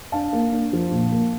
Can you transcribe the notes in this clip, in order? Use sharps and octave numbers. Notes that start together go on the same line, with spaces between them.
D4 F5 A5
A#3
D4
F3
A#2
A#3